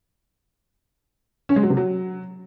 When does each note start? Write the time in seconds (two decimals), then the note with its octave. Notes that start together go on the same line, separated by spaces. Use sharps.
1.49 C#4
1.56 G#3
1.63 F#3
1.70 C3
1.77 F#3